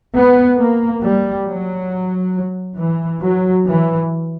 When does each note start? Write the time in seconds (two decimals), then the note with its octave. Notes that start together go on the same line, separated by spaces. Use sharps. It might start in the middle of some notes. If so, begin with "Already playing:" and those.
0.14 B3
0.57 A#3
1.02 G3
1.46 F#3
2.77 E3
3.21 F#3
3.66 E3